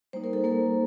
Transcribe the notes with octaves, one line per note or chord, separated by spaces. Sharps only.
G3 A#3 D#4 C5
A#4
A4
A#3 A#4